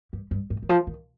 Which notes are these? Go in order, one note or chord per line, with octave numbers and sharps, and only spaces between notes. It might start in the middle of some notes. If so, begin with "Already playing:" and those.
G2
G2
G#2
D#3
F3
D#3